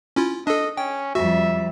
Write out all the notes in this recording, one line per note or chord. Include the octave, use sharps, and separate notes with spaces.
C#4 E4 F4
D4 A4 D#5
C#4 G5
F2 G3 F#4 E5